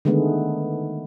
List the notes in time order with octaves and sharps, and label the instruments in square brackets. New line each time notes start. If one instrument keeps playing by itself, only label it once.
[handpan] D3 D#3 G#3 A3 B3